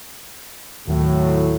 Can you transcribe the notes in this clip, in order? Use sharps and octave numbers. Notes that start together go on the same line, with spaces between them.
D#2 A2 D#3 F#3